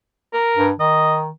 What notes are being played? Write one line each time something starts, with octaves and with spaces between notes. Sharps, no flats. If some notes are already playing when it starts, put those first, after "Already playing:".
A#4
G2
D#3 D#5